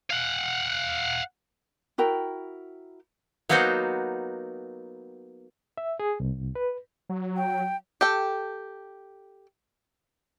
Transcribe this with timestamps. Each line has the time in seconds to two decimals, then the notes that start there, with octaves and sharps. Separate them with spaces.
0.11 F5 F#5
1.98 E4 F#4 A#4 G5
3.49 F#3 A#3 B3 D#4 F#4 C5
5.78 E5
6.00 G#4
6.20 C2
6.55 B4
7.09 F#3
7.37 G5
8.01 G4 A4 G5